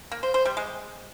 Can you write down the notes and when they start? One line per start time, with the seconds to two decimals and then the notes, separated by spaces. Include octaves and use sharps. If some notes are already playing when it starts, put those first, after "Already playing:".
0.12 A#3
0.23 C5
0.34 C5
0.45 G3
0.57 G#3